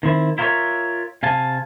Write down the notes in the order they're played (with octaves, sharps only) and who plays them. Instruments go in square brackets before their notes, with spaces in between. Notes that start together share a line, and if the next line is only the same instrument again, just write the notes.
[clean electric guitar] D#3 C4 E4
E4 F4 A#4 C5 C#5 E5
C3 F5 G#5 A5